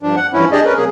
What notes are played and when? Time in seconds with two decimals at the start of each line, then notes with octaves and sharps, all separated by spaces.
0.03 G2 F3 D4
0.16 F#5
0.33 G2 E3 F3 C#4 E4
0.52 D4 G4 G#4 D5 D#5
0.65 C#4 A#4 B4
0.77 C3 F#3 A#3 G#4